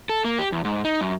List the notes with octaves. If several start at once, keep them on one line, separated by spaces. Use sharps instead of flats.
A4
A#3
G4
E2
G#2
D#4
F#2